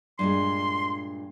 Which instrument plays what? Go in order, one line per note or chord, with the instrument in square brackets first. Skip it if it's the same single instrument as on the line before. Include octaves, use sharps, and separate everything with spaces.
[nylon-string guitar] G2 A#2 G#3 [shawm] C6